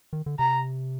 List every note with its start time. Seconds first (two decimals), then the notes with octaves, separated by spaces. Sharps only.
0.13 D#3
0.26 D3
0.39 C3 A#5